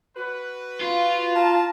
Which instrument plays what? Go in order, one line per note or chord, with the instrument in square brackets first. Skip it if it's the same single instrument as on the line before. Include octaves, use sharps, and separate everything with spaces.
[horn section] F#4 B4
[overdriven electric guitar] F4
[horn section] F5 A5 A#5